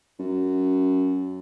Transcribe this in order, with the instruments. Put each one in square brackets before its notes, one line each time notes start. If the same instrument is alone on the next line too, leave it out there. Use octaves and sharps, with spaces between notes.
[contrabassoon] F#2